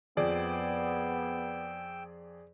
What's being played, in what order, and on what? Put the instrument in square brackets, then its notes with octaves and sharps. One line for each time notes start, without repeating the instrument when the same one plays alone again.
[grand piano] F2 [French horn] B3 [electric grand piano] G#4 D5 [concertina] G5 E6